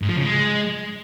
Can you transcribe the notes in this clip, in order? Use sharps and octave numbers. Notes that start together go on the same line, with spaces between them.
G#2
F3
C#3
G#3